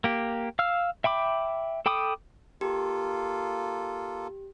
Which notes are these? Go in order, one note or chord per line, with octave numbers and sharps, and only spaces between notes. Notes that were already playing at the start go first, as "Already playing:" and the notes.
A#3 G4
F5 E6 F6
E5 G5 B5 D6
A4 G5 B5 D6 D#6
A#3 F4 G4 A4